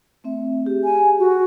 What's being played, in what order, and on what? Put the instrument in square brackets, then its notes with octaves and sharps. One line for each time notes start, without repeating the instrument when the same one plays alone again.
[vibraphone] A3 C4 E5
G4 G#4
[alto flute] G#5
F#4